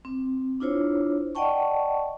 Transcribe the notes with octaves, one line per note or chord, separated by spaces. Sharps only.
C4
D4 E4 F4 C5 C#5
D5 D#5 F#5 G5 A5 C#6